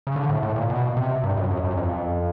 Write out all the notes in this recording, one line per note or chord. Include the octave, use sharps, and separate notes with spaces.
C#3
D3
A2
A2
A#2
B2
C3
G2
F#2
F#2
F#2
F2